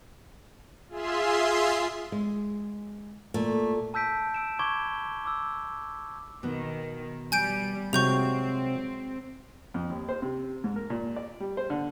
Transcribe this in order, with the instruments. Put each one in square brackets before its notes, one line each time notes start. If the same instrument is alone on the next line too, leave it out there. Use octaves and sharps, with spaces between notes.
[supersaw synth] F4 G#4 E5 C6
[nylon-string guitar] G#3
[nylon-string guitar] A#2 [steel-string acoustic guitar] A3
[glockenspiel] A5 E6 G6 B6 D7
E6 D7 E7
B5 C#6 D6 G#6 G7
D6 E6
[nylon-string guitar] B2 B3 [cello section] D#3
[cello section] G3 [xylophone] G#5 G6 D7
[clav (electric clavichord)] C3 F#3 [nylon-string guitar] G#3 [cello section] C4 [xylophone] C#6 G6 F7
[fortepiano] F2
D#2
C5
C3
G#2
A#4
A#2
D5
G3
C5
D3